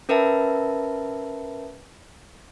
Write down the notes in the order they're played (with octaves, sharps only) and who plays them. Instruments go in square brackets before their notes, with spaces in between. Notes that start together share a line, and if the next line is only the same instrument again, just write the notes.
[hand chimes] C#4 A#4 B4 E5 A5